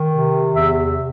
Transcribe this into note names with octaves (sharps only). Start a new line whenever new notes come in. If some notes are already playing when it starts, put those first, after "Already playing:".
Already playing: D#3
C3
E2 E5